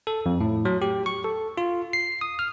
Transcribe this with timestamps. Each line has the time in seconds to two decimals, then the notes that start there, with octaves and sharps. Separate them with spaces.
0.07 A4
0.26 F2
0.41 A2
0.65 F#3
0.82 G4
1.06 C#6
1.24 A4
1.57 F4
1.93 C7
2.21 D#6
2.39 F6